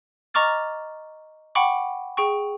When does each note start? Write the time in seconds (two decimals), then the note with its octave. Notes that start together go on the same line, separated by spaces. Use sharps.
0.34 D#5 A#5 C#6 D6 F6 A6
1.55 F#5 G5 B5 C#6 D6
2.17 G#4 G5 C#6